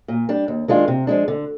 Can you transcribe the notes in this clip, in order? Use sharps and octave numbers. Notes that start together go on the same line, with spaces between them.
A#2
G3 D4
D#2
D#3 G#3 D4 F4
C3
F3 G#3 D4
D3